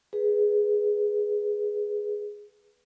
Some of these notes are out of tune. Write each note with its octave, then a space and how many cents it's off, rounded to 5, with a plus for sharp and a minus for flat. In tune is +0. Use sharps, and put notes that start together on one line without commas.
G#4 +0 B4 +0